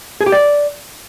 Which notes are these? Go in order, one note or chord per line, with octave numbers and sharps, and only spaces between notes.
G#4
G4
D5